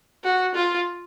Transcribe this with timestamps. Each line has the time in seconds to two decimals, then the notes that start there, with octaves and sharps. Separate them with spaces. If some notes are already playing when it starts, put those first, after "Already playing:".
0.24 F#4
0.54 F4